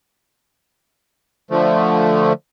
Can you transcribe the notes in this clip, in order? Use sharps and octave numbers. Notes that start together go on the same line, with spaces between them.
D3 F3 A3